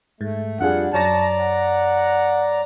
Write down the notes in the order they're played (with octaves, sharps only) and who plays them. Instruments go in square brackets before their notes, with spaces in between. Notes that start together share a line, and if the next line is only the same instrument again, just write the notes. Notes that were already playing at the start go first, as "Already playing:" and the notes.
[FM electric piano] G#2 [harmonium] A3
[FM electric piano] F2 F4 G#4 [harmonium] G3 D4 [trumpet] F#5
[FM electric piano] F#2 C#5 A#6 [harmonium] D5 A#5 [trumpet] A5
[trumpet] F#5